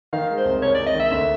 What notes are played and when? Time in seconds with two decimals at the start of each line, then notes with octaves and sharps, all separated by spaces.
0.13 D#3 F5
0.30 G#3
0.38 C5
0.45 C2
0.62 C2 C#5
0.74 D5
0.78 C2
0.86 D#5
0.95 D#3 E5
1.11 D2